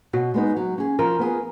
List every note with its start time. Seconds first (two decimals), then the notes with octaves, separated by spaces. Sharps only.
0.13 B2 F#4
0.34 G#3 B3 D#4
0.57 F#3
0.78 C#4 G#4
0.99 F3 A#4
1.19 B3 F4 G#4